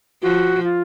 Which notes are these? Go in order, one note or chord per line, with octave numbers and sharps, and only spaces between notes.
F3 F#4
F4